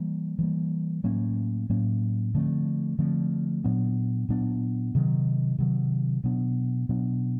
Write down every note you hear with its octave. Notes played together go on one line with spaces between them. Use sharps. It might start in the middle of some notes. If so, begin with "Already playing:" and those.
Already playing: E3 G3 A#3
E3 G3 A#3
A2 F#3 A#3 C#4
A2 F#3 A#3 C#4
D3 F3 A3 C4
D3 F3 A3 C4
A#2 F#3 B3 D4
A#2 F#3 B3 D4
C3 D#3 F#3
C3 D#3 F#3
B2 F#3 B3 D4
B2 F#3 B3 D4